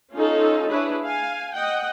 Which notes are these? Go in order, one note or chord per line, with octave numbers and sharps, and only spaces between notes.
C#4 D#4 F4 A4
D4 E4 G#4 B4 C#5
F5 G#5
D#5 F#5 G5